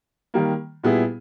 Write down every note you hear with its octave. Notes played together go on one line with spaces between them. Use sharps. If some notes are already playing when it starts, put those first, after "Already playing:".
D#3 G3 A#3
A#2 G3 B3 E4 G#4